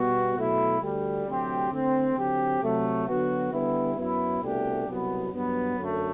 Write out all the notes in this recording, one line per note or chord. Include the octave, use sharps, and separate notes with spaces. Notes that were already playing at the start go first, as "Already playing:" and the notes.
Already playing: B2 G3 B3 F#4
B2 F#3 A3 E4
D2 D3 G3
D2 C3 F#3 C4 G4
D3 A3 C4
D3 F#3 C4 G4
C3 F#3 A3
D3 F#3 B3 F#4
D3 G3 B3 E4
F#2 F#3 B3 E4
C2 B2 A3 D4 G4
C2 B2 F#3 B3
G2 F#3 B3
F#2 D3 A3